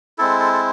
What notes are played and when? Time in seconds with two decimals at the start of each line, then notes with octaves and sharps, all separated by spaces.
0.18 G#3 C4 E4 A4
0.40 A4
0.53 A4